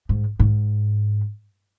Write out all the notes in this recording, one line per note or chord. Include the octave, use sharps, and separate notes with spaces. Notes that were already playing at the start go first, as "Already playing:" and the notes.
G#2
G#2